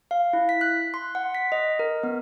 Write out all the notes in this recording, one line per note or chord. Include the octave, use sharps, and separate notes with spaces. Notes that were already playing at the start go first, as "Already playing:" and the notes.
F5
E4
B6
F#6
C6
F#5
B6
D#5
A#4
B3